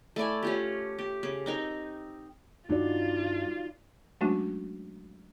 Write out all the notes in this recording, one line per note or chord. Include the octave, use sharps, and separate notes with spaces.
A3 E4 D5 G#5
C#4 F4 G4
G4
C#3
C4 D#4 A#4
G2 D#4 F4 F#4 D5
F#3 G#3 A3 C#4 D4 F#4